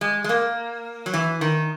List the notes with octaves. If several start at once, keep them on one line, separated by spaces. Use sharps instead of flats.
G#3
G#3
A#3
F#3
E3
D#3